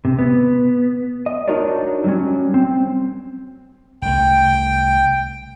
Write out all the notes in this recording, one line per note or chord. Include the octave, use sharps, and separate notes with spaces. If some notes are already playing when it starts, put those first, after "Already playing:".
C3
B3
D#5
D4 D#4 F#4 A#4 C#5 D5
F#3 G3 C#4
C4
C2 A3 G5